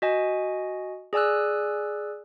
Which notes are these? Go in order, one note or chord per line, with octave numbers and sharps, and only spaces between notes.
F#4 D#5 G#5
G#4 D5 G#5 E6 F#6